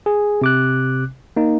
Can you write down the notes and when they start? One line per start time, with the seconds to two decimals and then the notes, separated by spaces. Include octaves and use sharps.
0.06 G#4
0.41 C3 D6 F#6
1.36 A#3 D#4